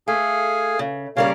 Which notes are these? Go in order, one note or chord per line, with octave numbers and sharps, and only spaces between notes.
A3 G#4 F5 G#5
C#3
C#3 G3 A#3 A#4 C#5 F5